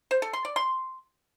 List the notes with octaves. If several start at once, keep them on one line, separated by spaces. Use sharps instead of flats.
C5
A4
C6
D5
C6